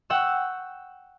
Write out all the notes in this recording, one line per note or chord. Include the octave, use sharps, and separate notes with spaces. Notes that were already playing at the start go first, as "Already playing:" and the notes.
F#5 G5 C#6 E6